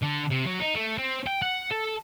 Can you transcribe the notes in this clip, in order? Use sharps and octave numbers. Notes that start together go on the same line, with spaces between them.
D3
C3
F#3
D#4
A3
C4
G5
F#5
A4